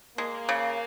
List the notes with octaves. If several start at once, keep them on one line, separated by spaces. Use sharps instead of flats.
G#3 A#3
C#3